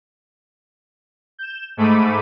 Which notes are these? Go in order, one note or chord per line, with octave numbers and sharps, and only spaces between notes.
G6 E7
G#2 A3 B5 D6 D#7